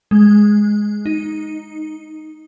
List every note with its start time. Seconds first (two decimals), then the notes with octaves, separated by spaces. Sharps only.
0.11 G#3
1.06 D#4